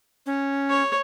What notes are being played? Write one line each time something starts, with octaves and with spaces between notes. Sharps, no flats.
C#4
C#5